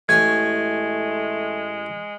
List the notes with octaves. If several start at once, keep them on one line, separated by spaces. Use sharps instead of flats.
A1 G#3 A3 C#5 G#5 G#6